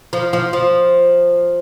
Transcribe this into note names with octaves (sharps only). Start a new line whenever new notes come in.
F3
F3
F3